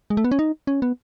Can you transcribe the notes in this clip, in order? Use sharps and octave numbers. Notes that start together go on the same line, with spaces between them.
G#3
A3
B3
C#4
D#4
C#4
B3